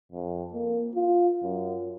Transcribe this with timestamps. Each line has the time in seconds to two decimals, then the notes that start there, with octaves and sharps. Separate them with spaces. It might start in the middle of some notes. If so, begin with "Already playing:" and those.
0.12 F2
0.53 A#3
0.95 F4
1.43 F#2